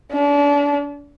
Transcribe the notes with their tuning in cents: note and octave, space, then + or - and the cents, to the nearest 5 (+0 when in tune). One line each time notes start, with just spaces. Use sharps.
D4 -35